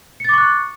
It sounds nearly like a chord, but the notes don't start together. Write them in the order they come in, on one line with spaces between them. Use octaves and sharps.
C#7 A6 D6 C#6 F#6